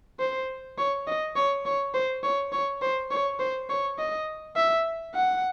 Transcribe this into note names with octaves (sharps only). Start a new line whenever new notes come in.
C5
C#5
D#5
C#5
C#5
C5
C#5
C#5
C5
C#5
C5
C#5
D#5
E5
F#5